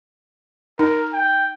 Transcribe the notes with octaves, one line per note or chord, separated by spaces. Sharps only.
D#4 A#4
G5